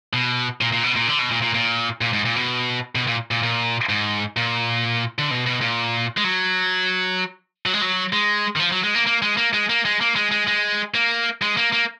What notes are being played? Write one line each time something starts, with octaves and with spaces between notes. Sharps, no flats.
B2
A#2
A#2
B2
A#2
D3
B2
A#2
A#2
A#2
A#2
G#2
A#2
B2
B2
A#2
A#2
A#2
G#2
A#2
D3
B2
B2
A#2
G#3
F#3
F#3
G#3
F#3
G#3
D#3
F3
F#3
G#3
A#3
A#3
G#3
A#3
G#3
A#3
G#3
A#3
G#3
G#3
G#3
A#3
G#3
A#3
A#3